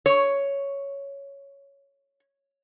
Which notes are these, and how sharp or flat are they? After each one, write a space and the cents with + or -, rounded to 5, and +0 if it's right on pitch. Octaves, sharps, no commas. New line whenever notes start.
C#5 +5